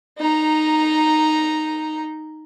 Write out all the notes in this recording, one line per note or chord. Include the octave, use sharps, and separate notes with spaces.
D#4 A#5